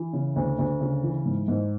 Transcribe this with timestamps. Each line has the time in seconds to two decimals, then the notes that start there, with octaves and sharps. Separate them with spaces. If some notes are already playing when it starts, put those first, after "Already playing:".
Already playing: E3
0.13 C#3
0.36 D2
0.59 D2
0.81 C#3
1.03 E3
1.26 G#2
1.48 G#2